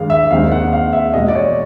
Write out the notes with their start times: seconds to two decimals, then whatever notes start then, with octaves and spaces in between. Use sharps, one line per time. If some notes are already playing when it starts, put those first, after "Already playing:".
Already playing: G2 D#3 G#3 F5
0.10 E5
0.30 D#2 D#3 G#3 C4 D#4 F5
0.52 F#5
0.73 F5
0.93 E5
1.14 E2 B2 G#3 D#5
1.28 D5
1.35 C#5